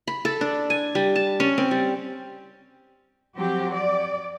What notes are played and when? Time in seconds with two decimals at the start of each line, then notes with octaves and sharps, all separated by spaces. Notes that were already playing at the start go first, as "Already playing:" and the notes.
0.07 B5
0.25 A4
0.41 D4
0.70 G#5
0.95 G3
1.15 A5
1.40 C#4
1.58 C4
1.71 G3
3.36 F2 F#3 C4 G4
3.74 D5